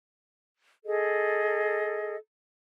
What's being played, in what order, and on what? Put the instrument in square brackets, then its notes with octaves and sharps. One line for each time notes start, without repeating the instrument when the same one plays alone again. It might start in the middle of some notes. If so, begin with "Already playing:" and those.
[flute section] G#4 A4 D#5